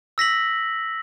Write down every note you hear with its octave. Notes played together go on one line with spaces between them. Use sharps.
E6 A#6 B6 F#7